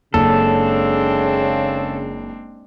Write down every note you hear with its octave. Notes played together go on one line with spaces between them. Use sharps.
F#1 C#3 G#3 C4 D4 A4